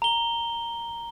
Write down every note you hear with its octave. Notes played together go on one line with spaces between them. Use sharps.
A#5 G7